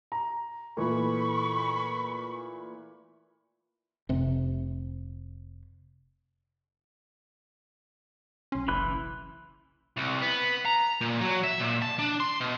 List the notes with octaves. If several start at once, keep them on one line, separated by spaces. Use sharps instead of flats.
A#5
A#2 E3 A3 B5 C#6
F1 C3
B1 C#4 C6
F#1 E3 B5 F#6
C2
B3
A#5
A#2
F#3
E5
A#2
A5
D4
C6
B2